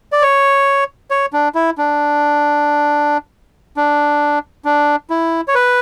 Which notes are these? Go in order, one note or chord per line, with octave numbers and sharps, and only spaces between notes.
D5
C#5
C#5
D4
E4
D4
D4
D4
E4
C#5
B4